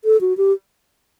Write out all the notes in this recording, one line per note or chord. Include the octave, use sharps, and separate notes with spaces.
A4
F#4
G4